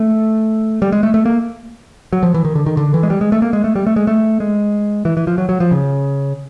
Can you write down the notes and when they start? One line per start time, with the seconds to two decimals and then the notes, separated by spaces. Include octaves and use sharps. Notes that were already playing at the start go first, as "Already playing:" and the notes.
Already playing: A3
0.82 G3
0.92 G#3
1.03 A3
1.14 A3
1.25 A#3
2.13 F#3
2.23 F3
2.34 E3
2.45 D#3
2.55 D3
2.66 D#3
2.77 D3
2.94 E3
3.03 G#3
3.10 G3
3.21 G#3
3.32 A3
3.42 A#3
3.53 G#3
3.64 A3
3.76 G3
3.87 A3
3.96 G#3
4.07 A3
4.40 G#3
5.05 E3
5.17 E3
5.27 F3
5.38 F#3
5.49 F#3
5.60 F3
5.71 C#3